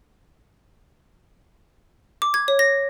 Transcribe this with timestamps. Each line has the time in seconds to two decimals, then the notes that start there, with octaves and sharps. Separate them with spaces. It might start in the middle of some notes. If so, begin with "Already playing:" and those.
2.22 D6
2.34 G#6
2.48 C#5
2.59 A#6